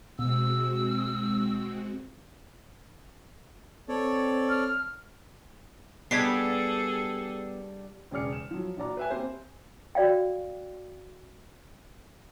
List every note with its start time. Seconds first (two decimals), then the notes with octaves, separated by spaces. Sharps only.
0.19 B2 G#3 C4 F#4 E6
3.89 C4 A4 C#5 D5
4.50 F6
6.11 G3 B3 D4 G#4 A4 G#6 B6 C7
8.11 E1 C#3 G#4 D5 F6 C#7
8.33 E7
8.51 F3 F#3
8.77 A#1 F#4 D5 A#5
8.97 B4 E5 G#5
9.10 A#3 C4 G4 A#4 C5
9.95 F#4 D5 F5 G5